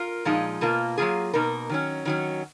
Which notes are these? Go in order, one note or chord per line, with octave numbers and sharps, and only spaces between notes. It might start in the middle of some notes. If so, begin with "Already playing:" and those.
Already playing: F4 A#4
A#2 F3 G#3 D#4
B2 A#3 F4
F#3 A#3 F4 G#4
B2 A#3 D#4 A#4
D#3 F#3 C#4
D#3 F#3 C#4